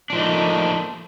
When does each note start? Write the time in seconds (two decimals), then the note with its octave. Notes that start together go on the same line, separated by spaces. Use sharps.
0.10 D4
0.13 F3
0.15 D#4
0.18 A3
0.20 A#3